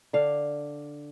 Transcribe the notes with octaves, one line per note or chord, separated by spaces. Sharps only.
D3 D4 F5